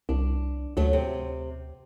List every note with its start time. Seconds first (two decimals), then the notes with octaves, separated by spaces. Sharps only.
0.09 C2 D4
0.77 D2 F#3 A3
0.93 C3